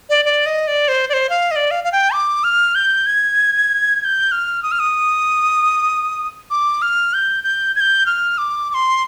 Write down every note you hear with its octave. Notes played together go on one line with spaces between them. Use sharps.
D5
D5
D#5
D5
C5
D5
C5
F5
D#5
D5
F5
F5
G5
D6
F6
G6
G#6
G#6
G6
F6
D#6
F6
D#6
D6
F6
G6
G6
G#6
G6
F6
D6
D6
C6